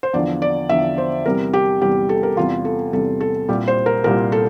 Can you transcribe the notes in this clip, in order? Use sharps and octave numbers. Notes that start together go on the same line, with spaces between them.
C5
E2 D3 F3 D5
D5
E2 D3 F3 E5
C5
E2 C3 G3 A#4
G4
E2 C3 G3 G4
A4
A#4
E2 C3 G3 F4
A4
E2 C3 G3 A4
A4
C2 A#2 G3 G4
C5
A#4
C2 A#2 G3 A#4
A4